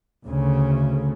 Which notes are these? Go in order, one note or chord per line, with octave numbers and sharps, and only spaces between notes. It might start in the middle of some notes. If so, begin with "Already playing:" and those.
D2 C#3